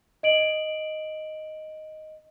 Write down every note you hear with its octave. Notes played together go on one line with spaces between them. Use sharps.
D#5 D7 F#7